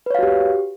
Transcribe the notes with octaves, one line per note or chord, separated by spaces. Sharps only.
F#4 G4 B4 C#5 F5